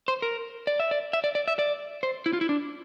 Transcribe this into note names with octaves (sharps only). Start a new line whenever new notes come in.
C5
A#4
D5
E5
D5
E5
D5
D5
E5
D5
C5
E4
F4
E4
D4